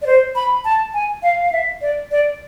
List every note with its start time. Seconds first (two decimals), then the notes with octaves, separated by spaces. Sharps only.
0.02 D5
0.06 C5
0.35 B5
0.65 A5
0.94 G#5
1.23 F5
1.42 F5
1.52 E5
1.81 D5
2.11 D5